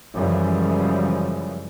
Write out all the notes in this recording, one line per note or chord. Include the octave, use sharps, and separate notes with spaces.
F#2 C#3 E3 F3 G3 G#3